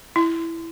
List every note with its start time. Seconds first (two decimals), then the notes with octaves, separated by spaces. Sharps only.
0.16 E4